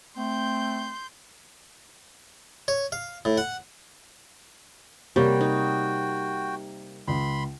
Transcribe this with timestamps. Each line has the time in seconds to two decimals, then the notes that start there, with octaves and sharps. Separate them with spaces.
0.17 A3 C4 C6 G6
2.68 C#5
2.92 F5
3.25 A2
3.38 F#5
5.16 C3 G3 A#3 F#4 C#5 G5
5.41 D#4
7.08 C#2 B5 C6